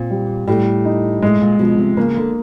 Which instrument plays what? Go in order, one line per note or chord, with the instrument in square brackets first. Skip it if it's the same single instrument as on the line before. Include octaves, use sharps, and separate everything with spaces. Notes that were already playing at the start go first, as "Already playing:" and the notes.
Already playing: [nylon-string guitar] A#2 [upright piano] C4
[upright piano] G3
[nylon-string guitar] A2 [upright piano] G3
[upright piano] D#4
[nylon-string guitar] A2 [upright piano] G#3
[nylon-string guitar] A#2
[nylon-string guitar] B2 [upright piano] F3
[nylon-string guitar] C3
[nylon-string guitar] C#3 [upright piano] A#3
[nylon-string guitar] D3